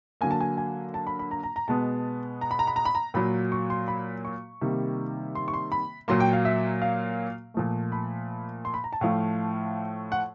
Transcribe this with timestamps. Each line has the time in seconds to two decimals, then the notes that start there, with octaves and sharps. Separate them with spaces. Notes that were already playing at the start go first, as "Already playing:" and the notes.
0.21 D3 F#3 A#3 G#5
0.31 A5
0.41 G#5
0.57 G#5
0.94 A5
1.07 B5
1.19 B5
1.31 A#5
1.44 A#5
1.56 A#5
1.68 B2 G#3 B3 A5
2.41 A#5
2.51 B5
2.59 A#5
2.67 B5
2.76 A#5
2.85 B5
2.95 A#5
3.14 A#2 F#3 A#3 B5
3.52 C#6
3.70 C6
3.88 B5
4.25 C#6
4.61 C3 D#3 G3 A#3
5.35 C6
5.48 C#6
5.54 C6
5.72 B5
6.08 A#2 F#3 A#3 C6
6.20 G5
6.33 F5
6.45 E5
6.82 F5
7.54 A#2 F3 A3
7.92 B5
8.65 C6
8.74 B5
8.84 A#5
8.93 A5
9.01 A2 F3 A3 F5
10.12 F#5